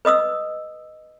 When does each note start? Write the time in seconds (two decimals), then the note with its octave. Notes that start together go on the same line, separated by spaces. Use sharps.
0.05 B4 D#5 D#6 E6